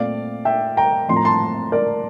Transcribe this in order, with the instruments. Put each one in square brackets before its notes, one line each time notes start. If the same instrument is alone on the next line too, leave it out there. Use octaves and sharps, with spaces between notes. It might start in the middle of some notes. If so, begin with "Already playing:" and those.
Already playing: [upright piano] A#2 A3 C4 D5 F5
E5 G5
G5 A#5
A2 F3 C4 C6
A#5
A5 C6
A#4 D5